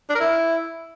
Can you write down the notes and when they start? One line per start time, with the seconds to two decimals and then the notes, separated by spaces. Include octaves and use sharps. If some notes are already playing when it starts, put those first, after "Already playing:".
0.10 D4
0.15 A#4
0.20 E4